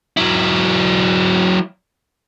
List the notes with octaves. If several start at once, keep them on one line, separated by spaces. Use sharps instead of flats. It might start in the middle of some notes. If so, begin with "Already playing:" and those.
F#3 E4